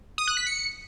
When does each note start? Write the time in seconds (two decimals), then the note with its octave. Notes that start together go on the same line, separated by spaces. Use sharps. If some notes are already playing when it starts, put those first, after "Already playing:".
0.18 D#6
0.27 F#6
0.37 B6
0.46 C#7